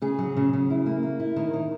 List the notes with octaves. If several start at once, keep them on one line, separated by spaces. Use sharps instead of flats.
C#3 G#4
F#3
C#3
C#3
E4
A#3
A#3
E4
D#3
D#3